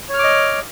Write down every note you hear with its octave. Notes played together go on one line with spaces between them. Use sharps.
C#5 D#5 D6 F6